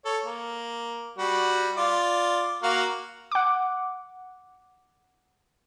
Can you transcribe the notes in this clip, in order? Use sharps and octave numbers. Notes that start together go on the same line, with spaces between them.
A4 C#5
A#3
G3 F#4
F4 D5
A#3 F#4 F5
F#5 D6